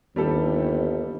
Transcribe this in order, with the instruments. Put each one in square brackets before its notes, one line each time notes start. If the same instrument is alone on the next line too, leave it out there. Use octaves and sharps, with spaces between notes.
[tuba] G1 [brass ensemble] D#2 [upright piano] G3 G4 A4